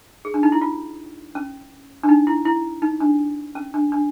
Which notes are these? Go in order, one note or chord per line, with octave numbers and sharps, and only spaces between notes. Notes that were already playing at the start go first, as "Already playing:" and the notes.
G#4
D4
D#4
E4
F4
C#4
D4
D#4
E4
E4
D#4
D4
C#4
D4
D4